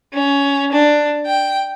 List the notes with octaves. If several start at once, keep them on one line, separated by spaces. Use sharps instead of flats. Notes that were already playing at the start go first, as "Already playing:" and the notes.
C#4
D4
G5